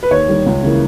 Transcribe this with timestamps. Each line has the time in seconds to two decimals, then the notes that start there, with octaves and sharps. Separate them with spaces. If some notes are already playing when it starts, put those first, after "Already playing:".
0.03 B4
0.11 D#2 C#5
0.28 D#3 G3
0.46 C#2
0.63 C#3 E3 A#3